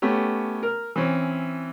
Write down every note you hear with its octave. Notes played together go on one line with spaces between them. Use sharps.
A3 B3 C#4 G4
A#4
E3 C4 C#4